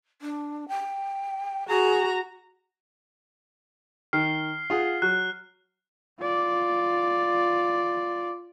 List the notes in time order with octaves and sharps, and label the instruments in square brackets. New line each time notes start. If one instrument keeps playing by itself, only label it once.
[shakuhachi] D4
G5
[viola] F#4 A#5 [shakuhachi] G#4
[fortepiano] D#3 [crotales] F6 C7
[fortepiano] F4 G#4 F#5
[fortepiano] F#3 [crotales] F#6
[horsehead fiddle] F4 D5